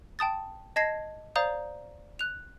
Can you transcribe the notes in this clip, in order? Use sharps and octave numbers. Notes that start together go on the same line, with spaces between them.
G5 A5 D#6 A6
D#5 A5 G#6 A#6 C7
C5 D5 F5 A#5 D#6 G6
F#6 F7